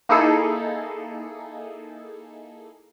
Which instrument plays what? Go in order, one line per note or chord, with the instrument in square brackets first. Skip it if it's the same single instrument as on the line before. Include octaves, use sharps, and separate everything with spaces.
[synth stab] A#3 D#4 E4 G#4 A4